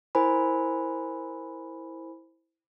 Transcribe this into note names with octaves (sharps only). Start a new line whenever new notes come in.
E4 A#4 C5 G#5 B5